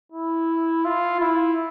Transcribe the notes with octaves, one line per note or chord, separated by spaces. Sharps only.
E4
F4
E4